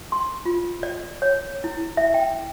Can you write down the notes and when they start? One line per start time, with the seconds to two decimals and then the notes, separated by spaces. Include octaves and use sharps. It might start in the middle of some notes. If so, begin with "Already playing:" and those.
0.12 C6
0.45 F4
0.83 D5
1.22 C#5
1.64 E4
1.97 E5
2.14 G5